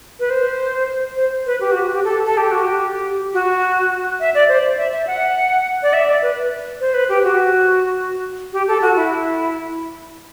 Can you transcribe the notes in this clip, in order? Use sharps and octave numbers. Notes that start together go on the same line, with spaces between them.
B4
C5
C5
B4
G4
F#4
G4
A4
A4
G4
F#4
G4
F#4
E5
D5
C5
D5
E5
E5
F#5
D5
E5
D5
B4
C5
B4
G4
F#4
G4
A4
F#4
E4